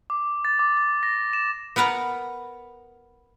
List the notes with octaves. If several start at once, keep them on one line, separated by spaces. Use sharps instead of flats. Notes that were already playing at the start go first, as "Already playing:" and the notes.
D6
A6
D6
A6
A#6
E7
B3 A#4 B4 F#5 A#5